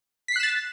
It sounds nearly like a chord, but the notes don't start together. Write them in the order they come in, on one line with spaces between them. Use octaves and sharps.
B6 C7 F#6 E7 A6